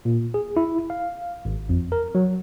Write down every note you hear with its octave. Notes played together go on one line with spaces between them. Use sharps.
A#2
G#4
E4
F5
G#1
F2
A#4
F#3